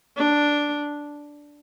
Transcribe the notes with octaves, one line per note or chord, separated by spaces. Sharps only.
D4